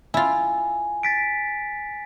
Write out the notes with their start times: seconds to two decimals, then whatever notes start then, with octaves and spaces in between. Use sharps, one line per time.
0.14 E4 F4 G#5
1.03 A6 B6 D7